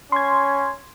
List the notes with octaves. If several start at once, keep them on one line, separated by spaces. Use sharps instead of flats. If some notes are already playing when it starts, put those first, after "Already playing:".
C#4 C6 G#6